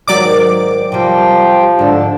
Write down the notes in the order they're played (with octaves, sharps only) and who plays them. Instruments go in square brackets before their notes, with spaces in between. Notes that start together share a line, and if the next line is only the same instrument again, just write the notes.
[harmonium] G#2 [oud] D#3 A#4 [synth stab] F#3 D5 D6
[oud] C3 G3 [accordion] F3 [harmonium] C5 G5
[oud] G#2 A4 [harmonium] D3 D4